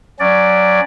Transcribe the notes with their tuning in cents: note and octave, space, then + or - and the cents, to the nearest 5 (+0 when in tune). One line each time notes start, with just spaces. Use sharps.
F#3 +0 C#4 +0 D5 +0